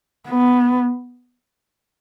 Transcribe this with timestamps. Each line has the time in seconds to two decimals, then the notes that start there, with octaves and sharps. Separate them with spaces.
0.29 B3